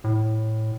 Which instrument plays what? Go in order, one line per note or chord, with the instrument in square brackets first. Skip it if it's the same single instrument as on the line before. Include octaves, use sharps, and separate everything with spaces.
[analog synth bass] A2